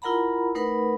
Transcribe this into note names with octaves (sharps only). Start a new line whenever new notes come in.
E4 F4 A#4 F#5 A#5 B5
A3 D#4 A#4 B4 F#5 B5